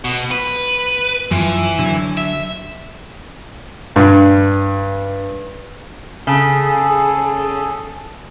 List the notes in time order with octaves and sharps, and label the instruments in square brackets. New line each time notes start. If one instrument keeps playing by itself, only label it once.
[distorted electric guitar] B2
B4
[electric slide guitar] F#2 F3 [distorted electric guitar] E3
[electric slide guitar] D3 F#3
[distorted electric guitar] E5
[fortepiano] G2
[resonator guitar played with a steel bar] C#3 [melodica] G#4 A4